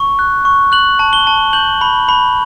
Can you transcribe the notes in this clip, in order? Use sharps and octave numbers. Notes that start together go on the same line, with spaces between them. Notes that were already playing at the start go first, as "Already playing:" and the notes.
Already playing: C#6
F#6
C#6
F#6 F#7
A5
G7
A5
G6 F#7
B5
B5